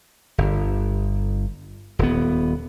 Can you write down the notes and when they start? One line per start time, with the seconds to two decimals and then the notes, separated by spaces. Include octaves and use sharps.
0.38 G1
1.99 D#1 B3